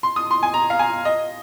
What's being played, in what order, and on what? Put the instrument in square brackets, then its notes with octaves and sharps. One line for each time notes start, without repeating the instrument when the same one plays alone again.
[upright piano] C6
D#6
C6
G#5
A#5
F5
G#5
D#5